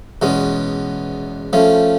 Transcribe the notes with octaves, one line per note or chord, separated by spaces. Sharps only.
E2 B2 G#3 C#4
F3 A3 C#4